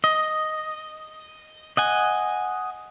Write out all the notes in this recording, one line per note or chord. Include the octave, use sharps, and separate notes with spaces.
D#5
D#5 F#5 G#5